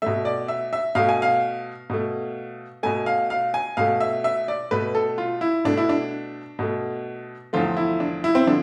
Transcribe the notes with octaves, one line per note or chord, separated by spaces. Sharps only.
B2 A3 E5
D5
E5
E5
B2 A3 F5
G#5
F5
B2 A3
B2 A3 G#5
F5
F5
G#5
B2 A3 F5
E5
E5
D5
B2 A3 B4
A4
F4
E4
B2 A3 D4
E4
D4
B2 A3
E2 D3 F3 A3 F4
E4
D4
E4
C4
D3 F3 D4